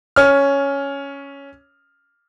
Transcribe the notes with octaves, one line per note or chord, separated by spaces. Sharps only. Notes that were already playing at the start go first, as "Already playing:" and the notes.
C#4 F6